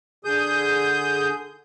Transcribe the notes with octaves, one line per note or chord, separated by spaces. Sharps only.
D3 G#4 D#6 G6